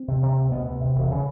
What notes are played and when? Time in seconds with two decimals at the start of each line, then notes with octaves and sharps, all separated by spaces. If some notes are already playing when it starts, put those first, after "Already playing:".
Already playing: C4
0.08 C3
0.23 C3
0.38 D2
0.52 D2 B2 B3
0.67 C3
0.81 C3
0.96 E1
1.11 C#3